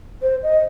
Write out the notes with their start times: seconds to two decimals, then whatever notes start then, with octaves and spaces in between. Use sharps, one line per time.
0.22 C5
0.43 D#5